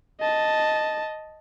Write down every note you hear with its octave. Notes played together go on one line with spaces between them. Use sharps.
D#5 A5